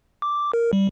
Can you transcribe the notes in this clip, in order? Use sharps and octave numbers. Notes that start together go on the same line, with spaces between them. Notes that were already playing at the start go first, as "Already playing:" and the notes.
D6
A#4
G3